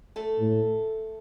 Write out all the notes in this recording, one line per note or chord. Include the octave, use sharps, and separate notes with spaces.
A3 A4
A2